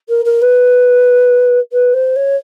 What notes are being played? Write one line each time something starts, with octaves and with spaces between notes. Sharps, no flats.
A#4
A#4
B4
B4
C5
C#5